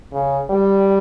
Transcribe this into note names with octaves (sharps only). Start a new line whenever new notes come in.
C#3
G3